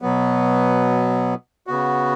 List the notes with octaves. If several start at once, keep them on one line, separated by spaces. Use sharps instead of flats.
B2 F#3 B3
C#3 B3 F#4